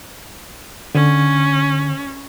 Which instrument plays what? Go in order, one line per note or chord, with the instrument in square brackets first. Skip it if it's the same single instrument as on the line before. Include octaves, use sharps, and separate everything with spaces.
[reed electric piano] D3 [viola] C#4